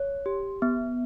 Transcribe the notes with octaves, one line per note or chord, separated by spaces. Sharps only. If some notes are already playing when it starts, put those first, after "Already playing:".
Already playing: C#5
G4
B3